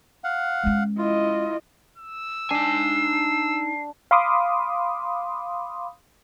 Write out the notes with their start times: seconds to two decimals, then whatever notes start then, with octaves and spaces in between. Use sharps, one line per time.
0.24 F5 F#5
0.63 G#3 C#4
0.98 E4 F4 D#5
1.98 E6
2.51 D4 D#4 G#5 C7
4.11 F5 B5 C6 D6 D#6